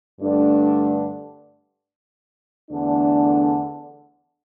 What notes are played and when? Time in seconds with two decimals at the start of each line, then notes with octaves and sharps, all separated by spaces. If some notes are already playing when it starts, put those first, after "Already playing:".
0.21 G2 D3 A3 D4
2.70 E2 D3 A3 D4